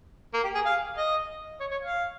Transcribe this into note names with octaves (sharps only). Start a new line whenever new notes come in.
A#3
G4
G#4
F5
D#5
C#5
C#5
F5